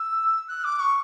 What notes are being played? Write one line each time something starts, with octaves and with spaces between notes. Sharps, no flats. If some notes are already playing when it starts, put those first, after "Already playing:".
Already playing: E6
F#6
D6
C#6